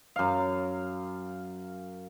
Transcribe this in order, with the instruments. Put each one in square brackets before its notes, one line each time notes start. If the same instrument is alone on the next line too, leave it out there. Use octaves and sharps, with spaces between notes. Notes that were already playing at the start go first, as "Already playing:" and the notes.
[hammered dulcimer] F#2 F5